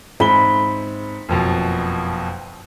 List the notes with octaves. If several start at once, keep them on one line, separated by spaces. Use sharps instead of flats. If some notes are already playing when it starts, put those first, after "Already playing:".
G#2 C4 B5 G7
F#1 F2 B2